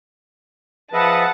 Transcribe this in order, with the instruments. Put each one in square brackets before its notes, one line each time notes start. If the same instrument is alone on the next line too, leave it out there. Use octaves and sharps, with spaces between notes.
[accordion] F3 B4 [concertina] G#4 D#5 E5 [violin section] F#5 A5